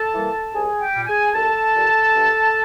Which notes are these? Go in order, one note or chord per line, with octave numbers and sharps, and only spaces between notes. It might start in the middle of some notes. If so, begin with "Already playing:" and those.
Already playing: A4 A5
E3 G3 A#3
C2 G#4 G#5
G4 G5
A#2 G3
G#4 G#5
C2 A4 A5
A#2 G3
G2